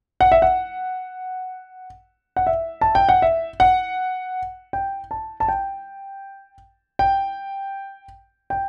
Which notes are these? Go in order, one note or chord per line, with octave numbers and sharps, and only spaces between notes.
F#5
E5
F#5
F#5
E5
A5
G5
F#5
E5
F#5
G5
A5
A5
G5
G5
G5